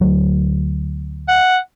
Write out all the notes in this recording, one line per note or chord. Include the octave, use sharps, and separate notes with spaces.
D2 F#3
F#5